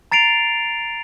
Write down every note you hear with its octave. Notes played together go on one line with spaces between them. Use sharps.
A#5 A6 C7 D7 F7